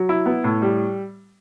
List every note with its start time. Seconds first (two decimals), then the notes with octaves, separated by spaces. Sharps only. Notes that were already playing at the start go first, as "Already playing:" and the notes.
Already playing: F#3
0.09 E4
0.26 B3
0.44 A2
0.62 G3